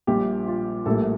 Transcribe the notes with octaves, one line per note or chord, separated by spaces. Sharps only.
A#1 A#2 G3 G4
F4
A#1 A2 G3 A#3 A4